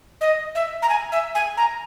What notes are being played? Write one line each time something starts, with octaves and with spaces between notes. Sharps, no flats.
D#5
E5
A#5
G#5
E5
G#5
A#5